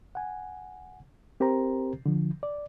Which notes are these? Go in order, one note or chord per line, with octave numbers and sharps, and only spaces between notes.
F#5 G#5
C4 G4 A#4 C5 A#5
D3 F3
D5